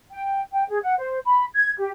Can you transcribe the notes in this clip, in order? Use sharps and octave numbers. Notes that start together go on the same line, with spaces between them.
G5
G5
G#4
F#5
C5
B5
G#6
G4